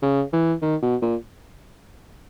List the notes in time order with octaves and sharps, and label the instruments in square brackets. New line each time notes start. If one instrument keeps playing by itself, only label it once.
[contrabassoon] C#3
E3
D#3
B2
A#2